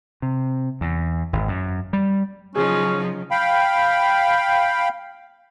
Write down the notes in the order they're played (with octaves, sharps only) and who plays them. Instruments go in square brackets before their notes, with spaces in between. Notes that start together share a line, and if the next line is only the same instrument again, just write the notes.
[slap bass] C3
E2
G#1
F#2
G3
[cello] C#3 F#3 [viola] F3 D#4 [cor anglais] C#4 [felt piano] G#4
[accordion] F5 G5 B5